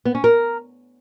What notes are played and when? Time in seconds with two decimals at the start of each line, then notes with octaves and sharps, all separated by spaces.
0.05 B3
0.15 C#4
0.24 A#4